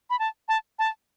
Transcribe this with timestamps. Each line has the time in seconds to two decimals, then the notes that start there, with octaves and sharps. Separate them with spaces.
0.10 B5
0.19 A5
0.48 A5
0.79 A5